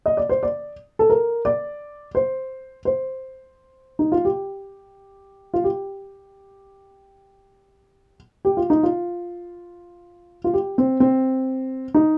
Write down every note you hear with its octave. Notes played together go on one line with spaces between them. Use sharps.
D#5
D5
C5
D5
A4
A#4
D5
C5
C5
D#4
F4
G4
F4
G4
G4
F4
D#4
F4
F4
G4
C4
C4
D#4